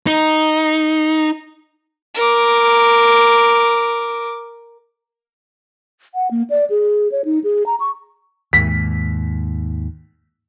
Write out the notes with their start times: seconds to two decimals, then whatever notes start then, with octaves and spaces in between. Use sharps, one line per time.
0.07 D#4
2.15 A#4 D6
6.15 F#5
6.31 A#3
6.50 D5
6.70 G#4
7.12 C#5
7.25 D#4
7.44 G#4
7.66 A#5
7.80 C#6
8.53 D#2 G#2 B6